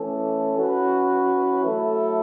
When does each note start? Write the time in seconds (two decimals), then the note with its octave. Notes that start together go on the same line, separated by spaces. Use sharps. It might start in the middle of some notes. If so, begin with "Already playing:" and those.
Already playing: E3 A3 C#4 A4
0.58 E3 C#4 F#4 B4
1.65 F#3 A3 E4 A4